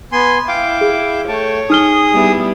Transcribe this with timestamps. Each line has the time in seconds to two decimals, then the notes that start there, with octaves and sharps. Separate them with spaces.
0.12 B3 G#5 C6
0.48 E4 F5 G5 D6
0.81 G#4
1.28 A3 C#5 G5 A5
1.70 D#4 G#4 D#6 F6 G7
2.12 G3 B3 E4